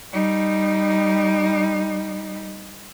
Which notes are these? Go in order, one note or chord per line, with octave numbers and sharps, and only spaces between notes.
G3 D#4